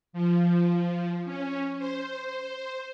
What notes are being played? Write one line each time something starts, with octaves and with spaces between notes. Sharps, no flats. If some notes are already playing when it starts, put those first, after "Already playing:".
F3
C#4
C5